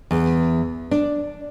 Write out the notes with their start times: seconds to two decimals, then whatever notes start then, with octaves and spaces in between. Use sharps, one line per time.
0.11 E2
0.91 D4